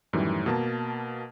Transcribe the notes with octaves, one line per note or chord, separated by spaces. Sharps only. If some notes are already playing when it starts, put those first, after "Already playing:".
F#2 A2 D#3 E3 G3
B2 A#3 A#4 A5